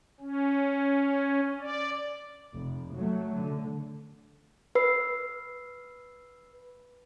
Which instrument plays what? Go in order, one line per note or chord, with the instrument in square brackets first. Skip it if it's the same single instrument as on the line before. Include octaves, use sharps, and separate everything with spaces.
[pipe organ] C#4
D5
[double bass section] F1
F#3 A3
D3
[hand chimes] B4 E6 C7